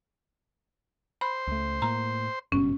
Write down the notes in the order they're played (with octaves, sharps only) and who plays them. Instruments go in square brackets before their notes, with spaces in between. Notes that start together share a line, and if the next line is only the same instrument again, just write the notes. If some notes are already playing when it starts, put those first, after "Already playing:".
[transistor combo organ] C5 [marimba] B5
[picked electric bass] C#2 A3
[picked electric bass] A2 A#3 [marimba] A#5
[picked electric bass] F#1 G2 B2 [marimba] C#4